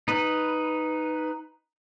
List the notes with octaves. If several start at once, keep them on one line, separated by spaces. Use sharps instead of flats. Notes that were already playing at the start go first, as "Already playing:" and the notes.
D#4 B4